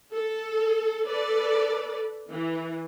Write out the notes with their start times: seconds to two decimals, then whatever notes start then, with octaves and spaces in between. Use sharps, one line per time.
0.13 A4
1.06 A4 B4 D5
2.30 E3